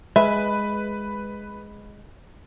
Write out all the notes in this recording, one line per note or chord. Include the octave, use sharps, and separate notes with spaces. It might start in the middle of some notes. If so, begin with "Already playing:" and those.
G#3 B4 E5